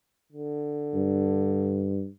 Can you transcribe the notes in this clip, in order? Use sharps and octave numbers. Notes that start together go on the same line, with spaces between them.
D3
G2